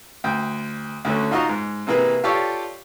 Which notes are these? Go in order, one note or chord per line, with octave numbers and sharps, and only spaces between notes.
D2 G5
D2 D3 A3 C#4
D#4 F4 F#4 D#5 A#5
G#2
C3 E3 A#3 G#4 B4
F4 G4 A4 C#5 D5